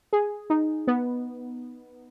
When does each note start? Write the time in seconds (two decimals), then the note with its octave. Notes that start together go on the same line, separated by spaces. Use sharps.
0.13 G#4
0.50 D#4
0.87 B3